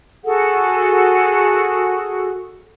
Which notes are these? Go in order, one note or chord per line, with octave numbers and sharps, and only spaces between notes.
F#4 G#4 A4 F#5